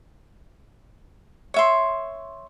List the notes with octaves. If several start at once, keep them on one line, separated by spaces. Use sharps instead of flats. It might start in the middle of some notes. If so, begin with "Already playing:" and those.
C#5 E5 C6